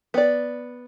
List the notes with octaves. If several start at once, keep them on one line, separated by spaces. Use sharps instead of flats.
B3 D5